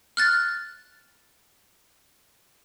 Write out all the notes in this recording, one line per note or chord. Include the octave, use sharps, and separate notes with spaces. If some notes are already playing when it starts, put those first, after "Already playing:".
F6 F#6 A6